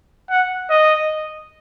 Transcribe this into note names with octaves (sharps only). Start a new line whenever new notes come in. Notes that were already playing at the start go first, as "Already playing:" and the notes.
F#5
D#5